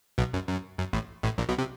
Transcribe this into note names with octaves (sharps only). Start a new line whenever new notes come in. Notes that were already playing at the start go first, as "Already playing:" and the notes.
B1 B2
F#2
F#2
F#2
A1 A2
A1 A2
A#1 A#2
B1 B2
C3